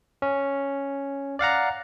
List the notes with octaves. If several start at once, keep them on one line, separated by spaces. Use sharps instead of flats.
C#4
D5 F5 F#5 A#5